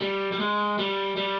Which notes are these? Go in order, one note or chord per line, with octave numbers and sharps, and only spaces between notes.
G3
G3
G#3
G3
G3